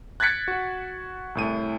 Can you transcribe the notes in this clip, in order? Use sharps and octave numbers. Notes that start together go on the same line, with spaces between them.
F#6 G#6 A6 B6 C#7 D7
F#4
C2 A2 D#7